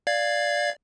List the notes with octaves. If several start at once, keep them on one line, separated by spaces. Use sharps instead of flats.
D5 F5 G#6